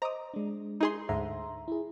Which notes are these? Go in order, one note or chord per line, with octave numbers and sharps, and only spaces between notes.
C5 D#5 A#5 D6 D#6
G#3 D4
D#4 G#4 C6
D2 G#2 E5 A#5 C6
E4 G#4